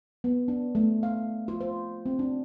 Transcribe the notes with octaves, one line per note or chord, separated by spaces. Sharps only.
B3
D4
A3
F5
F4
C5
C4
D4